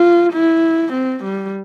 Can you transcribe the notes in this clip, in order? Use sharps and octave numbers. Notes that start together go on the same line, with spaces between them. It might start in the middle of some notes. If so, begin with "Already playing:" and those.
Already playing: F4
E4
C4
G3